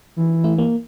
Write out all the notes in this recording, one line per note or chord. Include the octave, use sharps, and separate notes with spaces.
E3
A3 E4
A#3